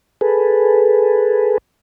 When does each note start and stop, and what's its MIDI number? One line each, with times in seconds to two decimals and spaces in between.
0.21 1.58 68
0.21 1.58 69
0.21 1.58 71